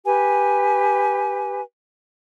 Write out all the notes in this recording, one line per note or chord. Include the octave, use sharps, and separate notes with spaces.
G4 B4 G#5